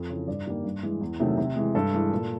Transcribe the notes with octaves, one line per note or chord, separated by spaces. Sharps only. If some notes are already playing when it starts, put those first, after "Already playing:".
Already playing: F2
C#3 E3
G2 D5
D#3 G3 A#3
G2
E3 G#3
E2
C3 D#3 F#3 A3
C3
E3 G#3
G2 A4
E3 G#3
A#2